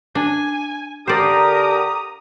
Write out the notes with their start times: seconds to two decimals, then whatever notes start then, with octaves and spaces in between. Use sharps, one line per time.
0.15 D4 G#5
1.08 D3 G4 A#4 C5 D5 A#5 D#6